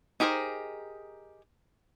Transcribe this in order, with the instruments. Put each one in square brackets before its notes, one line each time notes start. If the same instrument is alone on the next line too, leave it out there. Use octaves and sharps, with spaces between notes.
[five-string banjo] D#4 G4 G#4 A#4 C5